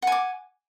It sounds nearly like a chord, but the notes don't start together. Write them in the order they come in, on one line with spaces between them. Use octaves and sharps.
F#5 G#5 D6